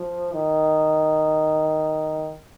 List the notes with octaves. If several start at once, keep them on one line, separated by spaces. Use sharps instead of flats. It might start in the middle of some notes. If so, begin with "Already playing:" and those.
Already playing: F3
D#3